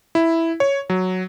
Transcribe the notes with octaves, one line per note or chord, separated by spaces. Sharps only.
E4
C#5
F#3